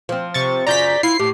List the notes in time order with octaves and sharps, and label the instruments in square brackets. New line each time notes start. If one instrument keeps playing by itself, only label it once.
[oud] F3 C4
[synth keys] C3 C#6 A6
[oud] F#2 C#3 F4 [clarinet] D5 [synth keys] A#5 G6 B6
[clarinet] E4 [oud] F4 [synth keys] C7
[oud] A2 [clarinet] G4